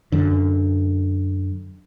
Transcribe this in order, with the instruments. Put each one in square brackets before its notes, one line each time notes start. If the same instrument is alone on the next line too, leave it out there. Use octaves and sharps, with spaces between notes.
[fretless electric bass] F#2 D3